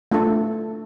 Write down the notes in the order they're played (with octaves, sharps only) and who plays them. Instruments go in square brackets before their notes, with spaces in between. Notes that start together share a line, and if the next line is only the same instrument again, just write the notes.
[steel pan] A3 D4 F4 A4